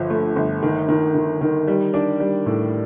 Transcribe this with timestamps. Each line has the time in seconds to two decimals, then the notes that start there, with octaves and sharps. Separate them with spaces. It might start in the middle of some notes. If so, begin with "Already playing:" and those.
Already playing: G1 F3
0.10 A3
0.36 G1
0.63 D#3
0.88 D#3
1.15 D#3
1.41 D#3
1.68 G3
1.94 D4
2.20 G3
2.46 A2